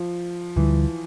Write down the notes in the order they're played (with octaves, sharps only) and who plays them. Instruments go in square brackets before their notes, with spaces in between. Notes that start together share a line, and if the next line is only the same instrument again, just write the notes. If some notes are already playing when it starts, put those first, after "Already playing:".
Already playing: [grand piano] F3
[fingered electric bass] D2 D3 G3 [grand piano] E3